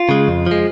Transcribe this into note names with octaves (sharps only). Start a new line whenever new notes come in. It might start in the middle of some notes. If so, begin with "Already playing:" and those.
Already playing: F4
C#3 G#3
F2
F3 G#3